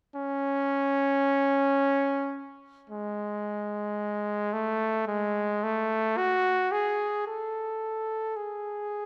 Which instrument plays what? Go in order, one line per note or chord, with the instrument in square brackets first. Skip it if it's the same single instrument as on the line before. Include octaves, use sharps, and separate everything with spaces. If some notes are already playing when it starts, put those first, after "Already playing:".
[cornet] C#4
G#3
A3
G#3
A3
F#4
G#4
A4
G#4